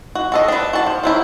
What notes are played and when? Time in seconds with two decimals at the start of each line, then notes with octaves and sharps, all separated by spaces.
0.15 F#4
0.32 F#4 A4 D#5
0.48 D4 B4
0.73 F#4 A5
0.86 F3
1.04 F3 F#3 E4